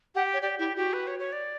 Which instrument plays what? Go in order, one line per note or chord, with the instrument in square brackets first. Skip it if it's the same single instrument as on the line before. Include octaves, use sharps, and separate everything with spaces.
[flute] G4 [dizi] F#5
[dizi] C#5
[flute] G4 [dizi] D5
[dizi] E4 [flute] G4
[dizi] F#4 [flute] G4
[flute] B4
C#5
C#5
D5